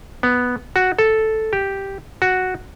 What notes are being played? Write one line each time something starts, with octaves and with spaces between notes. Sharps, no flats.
B3
F#4
A4
G4
F#4